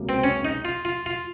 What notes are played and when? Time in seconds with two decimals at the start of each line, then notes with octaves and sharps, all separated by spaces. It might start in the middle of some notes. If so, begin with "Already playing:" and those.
Already playing: C#2 C3 F#3 A#3
0.09 C4
0.24 C#4
0.45 D#4
0.65 F4
0.85 F4
1.06 F4